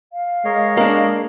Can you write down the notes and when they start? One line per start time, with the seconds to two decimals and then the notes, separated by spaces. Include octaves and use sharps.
0.12 F5
0.45 G#3 A#4 C#5 D#5
0.77 A#3 D4